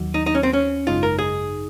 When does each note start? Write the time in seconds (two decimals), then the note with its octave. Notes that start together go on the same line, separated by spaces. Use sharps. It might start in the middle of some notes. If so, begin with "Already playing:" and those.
Already playing: D#2 D#3 F#3
0.14 D#4
0.26 D#4
0.35 C#4
0.43 C4
0.53 C#4
0.87 G#1 F#2 C#3 G#3 D#4 F4
1.03 A#4
1.19 G#4